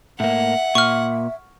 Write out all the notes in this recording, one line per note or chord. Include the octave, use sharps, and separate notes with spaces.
A2 A#3 E5 F#5
A#2 C#6 F6